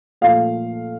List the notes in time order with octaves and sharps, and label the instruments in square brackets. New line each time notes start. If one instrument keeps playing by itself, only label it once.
[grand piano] A#2 F3 A3 F5